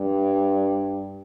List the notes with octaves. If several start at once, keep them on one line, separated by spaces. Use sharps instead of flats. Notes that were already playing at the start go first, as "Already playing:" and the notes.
Already playing: G2